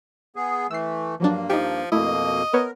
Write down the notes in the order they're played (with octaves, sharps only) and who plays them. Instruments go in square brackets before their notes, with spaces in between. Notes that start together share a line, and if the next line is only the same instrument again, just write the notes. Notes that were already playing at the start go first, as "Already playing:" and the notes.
[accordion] B3 G#4
[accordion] E3 A3 [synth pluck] E6 C7
[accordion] G2 A#3 [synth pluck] F3 F#3 D4
[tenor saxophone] F3 [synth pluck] D#4 G4
[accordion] F2 B2 A#3 [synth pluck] A3 E4 [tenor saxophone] D#5
[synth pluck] B3 B4 C#5 [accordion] A#4